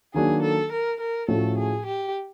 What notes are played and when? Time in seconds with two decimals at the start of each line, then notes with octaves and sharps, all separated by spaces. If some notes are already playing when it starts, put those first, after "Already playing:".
0.14 D#3 F#3 A#3 D4 G#4
0.42 A4
0.72 A#4
1.00 A#4
1.28 A2 F3 A3 C#4 F#4 A4
1.58 G#4
1.86 G4